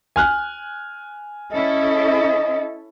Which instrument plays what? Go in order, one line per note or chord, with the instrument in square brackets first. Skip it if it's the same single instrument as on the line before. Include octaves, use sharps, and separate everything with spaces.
[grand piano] G#5 F6 F#6
[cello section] C#4 E4 A4 [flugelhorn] D#5